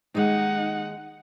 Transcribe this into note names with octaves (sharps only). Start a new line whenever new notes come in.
D#2 G#3 D#4 F#5